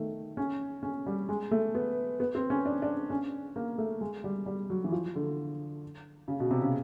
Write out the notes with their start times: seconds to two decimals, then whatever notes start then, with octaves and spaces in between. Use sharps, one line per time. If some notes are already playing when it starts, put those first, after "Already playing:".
Already playing: D#3 A3
0.37 C#4
0.83 C#4
1.06 G3
1.29 G#3
1.51 A3
1.75 B3
2.20 B3
2.35 C4
2.50 C#4
2.65 D4
2.82 D4
3.10 C#4
3.56 A#3
3.78 A3
4.01 G#3
4.24 G3
4.46 G3
4.70 F#3
4.84 E3
4.92 F3
5.15 D3
6.28 C#3
6.40 B2
6.51 C3
6.62 C#3